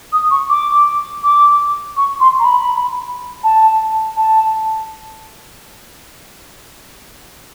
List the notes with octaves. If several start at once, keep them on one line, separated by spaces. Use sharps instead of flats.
D#6
C#6
D6
D6
C#6
C6
A#5
B5
A5
A5